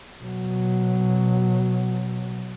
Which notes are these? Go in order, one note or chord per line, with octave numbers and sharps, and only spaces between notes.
B2 F#3